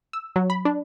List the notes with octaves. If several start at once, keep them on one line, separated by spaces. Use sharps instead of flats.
E6
F#3
B5
D4